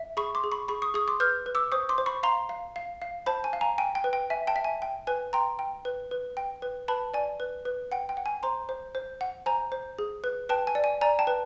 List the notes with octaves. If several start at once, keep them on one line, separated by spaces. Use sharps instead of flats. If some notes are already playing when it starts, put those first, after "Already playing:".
Already playing: E5
G#4 B5 C#6
C6 D6
G#4
B5 C#6
G#4 B5 C#6
C#6 D#6
G#4 C#6 D#6
C6 D6
B4 F6 G6
B4
D6 E6
C5 C#6 D#6
C6 D6
C5
B5 C#6
F5 A#5 C6
F5
F5
F5
C5 A5 B5
G#5
F5
G#5 A#5
G5 G#5
G5
B4
G5
E5 G#5
G5 A5
E5
G#5
G5
B4 G#5
G5 A#5 C6
G5
B4
B4
G5
B4
B4 A5 B5
D5 G#5
B4
B4
F#5 G5
G5
F#5
G#5
C5 A#5 C6
C5
C5
F#5
C5 G#5 A#5
C5
G#4
B4
B4 G5 A5
G#5
D5
G#5
D5 G#5 A#5
G5 A5
B4